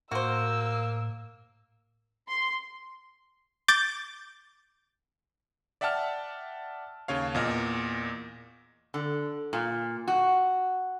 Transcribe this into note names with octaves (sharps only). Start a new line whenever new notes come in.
A2 A#3 F#4 C5 E6
C6
D6 G6 A6 D7
D5 E5 F#5 G5 A5 F6
D#2 C#3 C#5 F5
E2 A#2 D#5 F6
D3
A#2
F#4